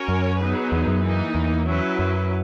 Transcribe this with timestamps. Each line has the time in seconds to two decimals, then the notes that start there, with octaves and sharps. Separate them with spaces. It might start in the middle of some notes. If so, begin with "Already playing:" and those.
Already playing: C#4 F#4 A#4 C#5
0.08 F#2
0.39 F#3 B3 D#4 G#4 B4
0.72 E2
0.87 F#2
1.03 E3 A#3 D#4
1.35 E2
1.66 F#3 C#4 E4 B4
1.99 F#2